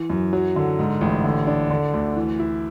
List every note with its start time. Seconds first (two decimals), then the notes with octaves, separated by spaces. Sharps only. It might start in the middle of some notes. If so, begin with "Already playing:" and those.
Already playing: E3
0.10 F#2
0.33 F#3
0.56 D3
0.79 G#2
1.01 A1
1.24 D3
1.47 D4
1.70 D3
1.94 D2
2.16 E3
2.39 E4